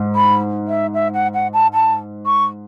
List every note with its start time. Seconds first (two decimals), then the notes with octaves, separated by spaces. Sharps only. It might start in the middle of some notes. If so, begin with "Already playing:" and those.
Already playing: G#2
0.15 B5
0.68 E5
0.94 E5
1.14 F#5
1.34 F#5
1.53 A5
1.74 A5
2.26 C#6